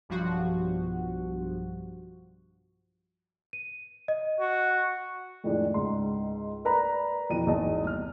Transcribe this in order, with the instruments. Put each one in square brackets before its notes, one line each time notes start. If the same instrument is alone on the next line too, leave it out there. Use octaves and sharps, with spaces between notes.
[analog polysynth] B1 G2 F3 F#4
[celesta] D#7
D#5
[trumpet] F#4
[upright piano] F2 A2 D#3 F3 G#3 D4
C#2 G#2 C6
A#4 B4 D5 A#5 B5
F2 B2 E3 D#7
G#1 E2 G#3 D#4 D#5 A5
C2 F6